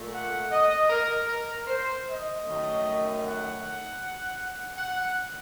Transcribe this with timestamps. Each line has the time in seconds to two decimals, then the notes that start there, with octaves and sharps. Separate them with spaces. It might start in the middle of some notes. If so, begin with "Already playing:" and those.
Already playing: A#2 A3
0.13 F#5
0.52 D#5
0.90 A#4
1.29 A#4
1.67 C5
2.06 D#5
2.46 F#2 D#3 A3
3.23 F#5
4.78 F#5